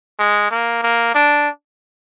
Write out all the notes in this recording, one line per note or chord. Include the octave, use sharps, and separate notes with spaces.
G#3
A#3
A#3
D4